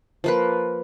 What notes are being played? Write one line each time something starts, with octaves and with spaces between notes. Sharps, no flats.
F3 A#3 B4